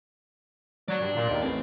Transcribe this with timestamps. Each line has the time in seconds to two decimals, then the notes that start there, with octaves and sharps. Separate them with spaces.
0.88 F#3 D4 D5
1.00 G2
1.15 A#2
1.28 D#2
1.43 A1 C4